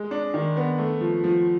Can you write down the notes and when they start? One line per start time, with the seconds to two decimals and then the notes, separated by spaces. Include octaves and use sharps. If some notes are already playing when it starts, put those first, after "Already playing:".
Already playing: G#3
0.11 D4
0.34 D#3
0.57 B3
0.78 A3
1.01 F3
1.24 F3